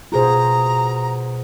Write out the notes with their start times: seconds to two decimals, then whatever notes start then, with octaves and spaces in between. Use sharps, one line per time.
0.12 B2 F4 F#4 G#4 C5 A#5